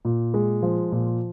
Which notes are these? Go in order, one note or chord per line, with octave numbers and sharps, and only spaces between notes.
A#2
G#3
F3
A#2